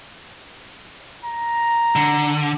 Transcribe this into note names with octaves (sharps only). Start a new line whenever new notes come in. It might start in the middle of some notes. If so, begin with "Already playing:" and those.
A#5
D3